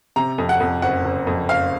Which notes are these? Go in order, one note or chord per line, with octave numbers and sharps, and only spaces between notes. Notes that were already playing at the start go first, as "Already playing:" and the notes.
C3 A#5
F2
F#5
F2
F#1 F#5
F#1
F2
F#1 F5